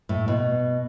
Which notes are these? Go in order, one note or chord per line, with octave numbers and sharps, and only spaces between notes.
A2
B2